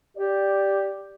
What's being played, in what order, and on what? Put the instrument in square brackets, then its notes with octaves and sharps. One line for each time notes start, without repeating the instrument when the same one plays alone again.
[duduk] G4 [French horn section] D5